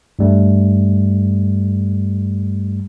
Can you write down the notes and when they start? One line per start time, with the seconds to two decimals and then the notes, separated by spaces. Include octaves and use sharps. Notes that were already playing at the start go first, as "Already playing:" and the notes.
0.19 G2 G3 A3